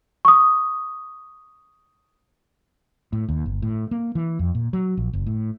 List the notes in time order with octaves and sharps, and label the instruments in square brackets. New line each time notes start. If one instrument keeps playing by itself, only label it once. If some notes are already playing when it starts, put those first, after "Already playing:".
[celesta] C#6 D#6
[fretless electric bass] A2
D#2
G1
A2
A#3
E3
F2
A#2
F#3
A#1
F#1
A2